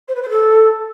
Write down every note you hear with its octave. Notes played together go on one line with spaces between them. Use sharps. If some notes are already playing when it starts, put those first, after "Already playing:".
C5
B4
C5
A4